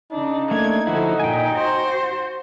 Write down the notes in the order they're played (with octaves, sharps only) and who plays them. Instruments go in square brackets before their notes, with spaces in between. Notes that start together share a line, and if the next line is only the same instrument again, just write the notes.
[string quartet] C#3 D4 [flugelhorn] D#4
[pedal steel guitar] A3 A#3 D4 [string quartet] G#6
[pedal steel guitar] D3 F3 E4 [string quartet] F#4 A4
[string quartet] A#2 [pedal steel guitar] G5 G#5
[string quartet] F#4 C5